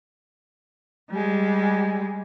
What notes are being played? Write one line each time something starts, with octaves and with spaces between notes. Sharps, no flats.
G3 G#3